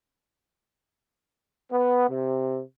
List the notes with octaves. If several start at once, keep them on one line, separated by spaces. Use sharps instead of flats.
B3
C3